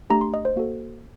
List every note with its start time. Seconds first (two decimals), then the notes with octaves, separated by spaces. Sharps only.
0.10 A3 D4 G4 A#5
0.21 C6
0.34 D#5
0.45 C5
0.56 A#3 F#4 A4